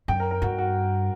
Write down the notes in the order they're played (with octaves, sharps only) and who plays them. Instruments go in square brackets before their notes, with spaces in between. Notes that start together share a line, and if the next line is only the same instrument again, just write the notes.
[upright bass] F#2 [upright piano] G5
[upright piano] A#4
A#4
[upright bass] G2 [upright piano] F#4
[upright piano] F#4